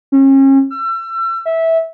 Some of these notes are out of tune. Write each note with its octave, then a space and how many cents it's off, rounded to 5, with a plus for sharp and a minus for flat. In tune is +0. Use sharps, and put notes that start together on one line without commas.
C#4 -35
E6 +35
E5 -15